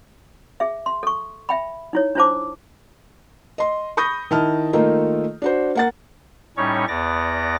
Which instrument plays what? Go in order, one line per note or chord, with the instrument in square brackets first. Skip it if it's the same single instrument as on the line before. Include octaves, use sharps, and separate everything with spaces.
[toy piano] G#4 E5
C6
A4 C#6
E5 G5 B5
D#4 E4 C#5
D4 E4 F4 C5 A5 D6
[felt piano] D#5 C6
B5 C#6 D#6 G6 A#6
D#3 E4 A5 F6
D#3 A3 A#3 D#4 F4 A4
D4 F#4 C5
A#3 F#5 A6
[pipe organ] A2 G3 C#4 D#4 C#5 C#6
E2 B3 D5 D6 A#6